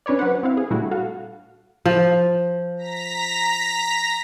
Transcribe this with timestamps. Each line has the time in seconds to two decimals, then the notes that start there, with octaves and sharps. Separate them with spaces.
0.06 C#4 D4 B4 C#5 D5
0.19 F#3 B4 C5 F#5
0.43 C4 E4 F5
0.57 G#4
0.70 A#2 G3 A3 D4 E4 F#4
0.91 F#4 A4 F5
1.85 F3
2.77 A#5 A#6 B6